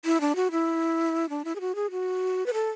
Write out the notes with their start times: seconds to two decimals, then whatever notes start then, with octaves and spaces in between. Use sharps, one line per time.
0.05 E4
0.21 D4
0.36 F#4
0.51 E4
1.29 D4
1.45 E4
1.55 G#4
1.60 F#4
1.75 G#4
1.91 F#4
2.46 B4
2.53 A4